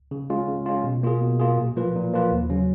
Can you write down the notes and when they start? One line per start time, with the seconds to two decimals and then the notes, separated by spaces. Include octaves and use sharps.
0.11 C#3
0.30 G#3 C#4 F4
0.48 C#3
0.66 G#3 C#4 F4
0.84 B2
1.03 A#3 F4 G#4
1.22 B2
1.40 A#3 F4 G#4
1.58 A#2
1.76 F3 A#3 F4 B4
1.95 A#2
2.13 F3 A#3 F4 B4
2.32 D#2
2.50 C#3 F#3 C#4